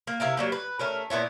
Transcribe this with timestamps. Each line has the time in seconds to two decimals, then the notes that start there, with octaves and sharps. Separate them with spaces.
0.07 A#3
0.20 C3 E4 A#4 F5
0.37 F#3 G3 A#3
0.52 B4
0.79 A3 C#4 A#4
1.10 A#2 B3 E4 C#5